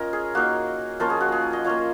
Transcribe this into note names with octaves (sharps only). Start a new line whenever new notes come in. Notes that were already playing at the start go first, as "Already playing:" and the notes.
Already playing: C#4 F4 A#4 C#5 D#5
G#4
A#3 D#4 F#4
F3 A#3 C#4 F4 A#4
G#4
F#4
G#4
D#5
A#3 C#4 F4 C#5